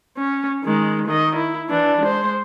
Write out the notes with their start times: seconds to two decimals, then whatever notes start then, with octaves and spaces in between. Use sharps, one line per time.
0.17 C#4
0.64 D#3 G#3
1.07 D#3 D#5
1.36 E4
1.70 E3 D4
2.01 G#3 C5